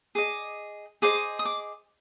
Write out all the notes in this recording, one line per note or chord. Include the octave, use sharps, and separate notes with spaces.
G#4 D#5 D6
G#4 C5 D#5 D6
D#6
D6